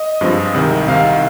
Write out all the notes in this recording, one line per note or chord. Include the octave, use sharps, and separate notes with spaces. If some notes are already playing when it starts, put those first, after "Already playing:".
Already playing: D#5
G2 F3 G#3 C4 F4
C2 C3 D#3
C2 C3 D#3 F5